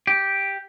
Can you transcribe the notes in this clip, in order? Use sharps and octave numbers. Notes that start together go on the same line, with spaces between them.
G4